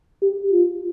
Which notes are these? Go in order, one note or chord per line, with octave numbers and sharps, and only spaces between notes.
G4
F4